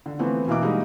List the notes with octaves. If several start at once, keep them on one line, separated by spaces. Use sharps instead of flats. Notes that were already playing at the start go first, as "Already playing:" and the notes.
D3
E3 F3 A3 B3 C4
B2 E3 A#3 E5 D6
G3 G#3 A#3 D#4 E4 F#4